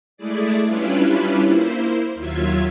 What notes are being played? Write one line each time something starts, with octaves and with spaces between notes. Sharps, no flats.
G#3 A3 E4 G#4 D5
G3 C#4 D4 E4 F4 B4
A#3 E4 C5
D#2 F#3 F4 E5 G#6